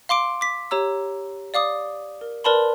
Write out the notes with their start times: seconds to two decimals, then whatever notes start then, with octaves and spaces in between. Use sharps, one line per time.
0.09 F5 C6 D6 D7
0.41 D6 B6
0.71 G4 C#5 A#5 E6
1.54 D5 F5 D6 D#6
2.21 A#4
2.44 A#4 B4 D5 A5 B5 C6